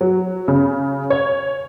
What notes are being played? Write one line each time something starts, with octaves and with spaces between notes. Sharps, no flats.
F#3
C#3
C#5